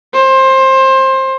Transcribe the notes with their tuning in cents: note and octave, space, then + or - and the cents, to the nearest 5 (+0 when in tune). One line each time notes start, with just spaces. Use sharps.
C5 +20